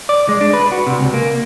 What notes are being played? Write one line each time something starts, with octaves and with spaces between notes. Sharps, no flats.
D5
G#3
D4
B4
F#4
C3
C#2
A#3